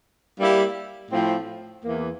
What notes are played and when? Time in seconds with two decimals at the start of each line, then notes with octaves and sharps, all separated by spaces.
0.38 G3 A#3 E4 G4
1.11 A2 F3 C4
1.83 E2 E3 A#3